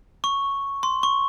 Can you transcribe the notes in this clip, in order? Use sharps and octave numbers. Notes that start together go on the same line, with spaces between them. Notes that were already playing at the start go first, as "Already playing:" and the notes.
C#6
C6
C#6